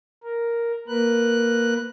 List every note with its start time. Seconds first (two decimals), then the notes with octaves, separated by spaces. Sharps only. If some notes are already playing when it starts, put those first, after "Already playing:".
0.23 A#4
0.88 A#3 A#4 B4 F#6